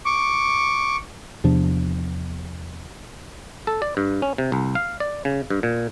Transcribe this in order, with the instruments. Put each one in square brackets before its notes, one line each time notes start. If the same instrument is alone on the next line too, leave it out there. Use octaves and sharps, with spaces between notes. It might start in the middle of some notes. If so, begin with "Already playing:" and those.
[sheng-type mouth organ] C#6 D6
[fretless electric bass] E2 C3 F3 D4
[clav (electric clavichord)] A4
D5
G2
C#4
C3
C2
F5
D5
C#3
G2
A#2